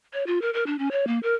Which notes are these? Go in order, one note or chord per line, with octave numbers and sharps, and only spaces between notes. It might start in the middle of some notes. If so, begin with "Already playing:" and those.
C#5
F4
A#4
A#4
D4
C#4
C#5
A#3
A#4